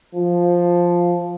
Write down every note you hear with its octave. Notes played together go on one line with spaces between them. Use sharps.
F3